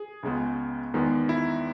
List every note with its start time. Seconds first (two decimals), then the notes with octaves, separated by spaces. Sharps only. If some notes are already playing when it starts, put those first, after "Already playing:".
Already playing: G#4
0.23 C#2 C#3 G#3 B3
0.94 E2 D#3 G#3 B3
1.29 E4